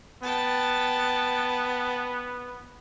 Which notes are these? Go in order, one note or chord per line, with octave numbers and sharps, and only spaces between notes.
B3 G5 A5